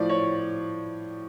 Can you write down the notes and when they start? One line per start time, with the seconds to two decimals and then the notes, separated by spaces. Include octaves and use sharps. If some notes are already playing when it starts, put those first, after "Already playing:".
Already playing: A2 F3 D5
0.09 C#5